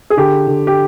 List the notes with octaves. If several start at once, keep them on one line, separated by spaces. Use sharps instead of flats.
G#4
D3 G4
D3
G4